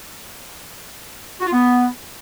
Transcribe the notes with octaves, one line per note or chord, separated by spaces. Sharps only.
F#4
F4
B3